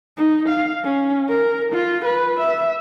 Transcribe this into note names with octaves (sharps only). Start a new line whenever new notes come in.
D#4
F5
C#4
A#4
F4
B4
E5